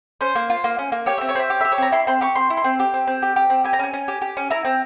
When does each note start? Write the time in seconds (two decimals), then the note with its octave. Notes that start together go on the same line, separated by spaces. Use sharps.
0.21 C#4 C5
0.35 A#3
0.50 F4
0.64 A#3
0.79 C#4
0.92 A#3
1.06 G4 C#5
1.18 C4 E5
1.29 C#5
1.35 C4 E5
1.50 G4 C#5
1.61 G4 E5
1.72 C#5
1.78 C4 A#5
1.92 E4 C6
2.07 C4 C6
2.21 G4 C#6
2.35 C4 C6
2.50 E4
2.57 C6
2.64 C4
2.79 G4
2.94 C4
3.07 C4
3.22 G4
3.36 G4
3.50 C4
3.64 G4 G#5
3.73 A#5
3.79 C#4 G#5
3.93 C#4
4.08 G4
4.22 G4
4.37 C#4
4.50 E4 A#5
4.65 C4